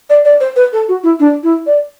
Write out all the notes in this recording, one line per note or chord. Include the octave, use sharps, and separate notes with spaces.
D5
D5
C5
B4
A4
F#4
E4
D4
E4
D5